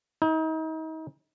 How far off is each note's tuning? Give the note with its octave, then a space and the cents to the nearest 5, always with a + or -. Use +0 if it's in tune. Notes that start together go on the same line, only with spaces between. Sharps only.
D#4 +35